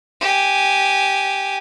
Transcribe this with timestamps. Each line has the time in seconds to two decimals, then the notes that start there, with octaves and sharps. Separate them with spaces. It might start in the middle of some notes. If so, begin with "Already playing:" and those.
0.21 G4 G#5